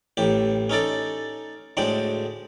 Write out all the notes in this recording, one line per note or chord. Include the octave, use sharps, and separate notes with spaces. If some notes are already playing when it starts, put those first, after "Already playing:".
A1 A2 G4
C#4 D#4 A4 D5
D2 A2 G#3 D4 G5